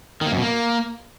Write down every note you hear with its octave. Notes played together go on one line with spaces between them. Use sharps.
D#3
A#3
F#2
B2
A#3